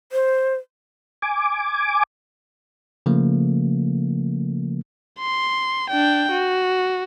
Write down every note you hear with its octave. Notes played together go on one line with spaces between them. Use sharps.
C5
G#5 D6
C#3 F3 A3 A#3
C6
D4 G5
F#4